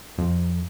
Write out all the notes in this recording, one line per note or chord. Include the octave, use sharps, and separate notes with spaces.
F2